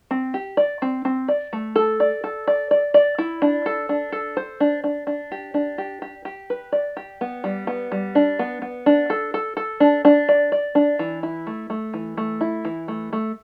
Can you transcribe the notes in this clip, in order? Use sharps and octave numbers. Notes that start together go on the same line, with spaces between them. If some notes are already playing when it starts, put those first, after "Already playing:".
C4
G4
D5
C4
C4
D5
A3
A4
D5
A4
D5
D5
D5
E4
D4
A4
D4
A4
C5
D4
D4
D4
G4
D4
G4
G4
G4
B4
D5
G4
B3
G3
B3
G3
D4
B3
B3
D4
A4
A4
A4
D4
D4
D5
D5
D4
E3
E4
A3
A3
E3
A3
E4
E3
A3
A3